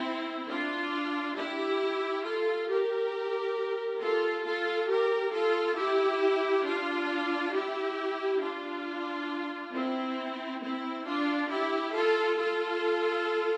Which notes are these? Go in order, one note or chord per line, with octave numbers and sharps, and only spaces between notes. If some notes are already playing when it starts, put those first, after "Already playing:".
Already playing: C4 E4
D4 F4
E4 G4
F4 A4
G4 A#4
F4 A4
F4 A4
G4 A#4
F4 A4
E4 G4
D4 F4
E4 G4
D4 F4
C4 E4
C4 E4
D4 F4
E4 G4
F4 A4
F4 A4